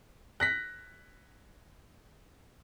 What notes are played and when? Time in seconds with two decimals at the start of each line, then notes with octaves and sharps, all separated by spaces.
0.40 F#6 A#6 B6